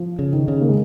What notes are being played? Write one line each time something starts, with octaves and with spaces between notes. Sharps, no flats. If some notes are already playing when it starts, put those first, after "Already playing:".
Already playing: F3
C#3
D#3
C#3
A#3
G#3